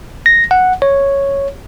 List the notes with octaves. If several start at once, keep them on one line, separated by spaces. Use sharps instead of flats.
A#6
F#5
C#5